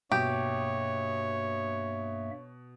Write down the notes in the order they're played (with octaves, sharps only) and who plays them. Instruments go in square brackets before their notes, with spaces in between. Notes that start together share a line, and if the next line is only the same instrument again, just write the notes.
[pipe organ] G2 A#3 E5 [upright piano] B2 [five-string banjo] G4 [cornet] C#5